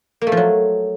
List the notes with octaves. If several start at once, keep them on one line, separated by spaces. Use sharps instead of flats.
A#3
A3
F3
F#3